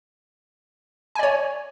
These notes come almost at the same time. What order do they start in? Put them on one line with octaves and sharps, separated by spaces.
G#5 D5 C#5